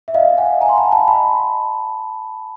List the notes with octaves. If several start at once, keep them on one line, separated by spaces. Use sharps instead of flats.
E5
D#5 F5
F#5 G#5
G#5 A#5
C6
A5 B5
A5 B5
A5 B5